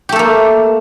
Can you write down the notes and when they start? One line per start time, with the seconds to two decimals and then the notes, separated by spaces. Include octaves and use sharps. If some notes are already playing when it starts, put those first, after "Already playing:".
0.09 G4
0.12 A3
0.16 A4
0.19 A#3